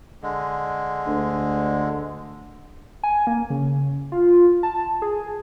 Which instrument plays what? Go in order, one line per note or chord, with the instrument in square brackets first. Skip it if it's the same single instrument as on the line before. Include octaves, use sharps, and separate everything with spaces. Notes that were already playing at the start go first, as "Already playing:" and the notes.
[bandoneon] D3 G#3
[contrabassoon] D2
[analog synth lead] G#5
A#3
C#3
F4
A5
G#4